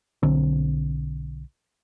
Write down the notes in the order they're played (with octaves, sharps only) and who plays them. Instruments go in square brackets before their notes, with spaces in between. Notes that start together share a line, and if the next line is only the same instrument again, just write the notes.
[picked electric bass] B1 D3 C4